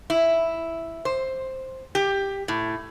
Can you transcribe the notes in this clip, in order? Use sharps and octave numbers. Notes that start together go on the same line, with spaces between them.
E4
C5
G4
A2